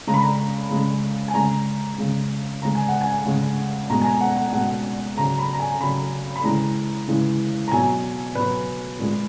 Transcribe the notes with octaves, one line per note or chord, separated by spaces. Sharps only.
C#3 G#3 A#5
B5
A#5
C#3 G#3
G#5
C#3 G#3 A#5
C#3 G#3
C#3 G#3 A#5
G#5
F#5
G#5
C#3 G#3
B2 G#3 A#5
G#5
A#5
F#5
F#5
B2 G#3 F#5
C#3 F#3 A#5
B5
A#5
G#5
C#3 F#3 B5
B5
C#3 E3 G#3 A#5
C#3 E3 G#3
A#5
B2 F#3 G#5
B2 F#3 B4
A#2 G#3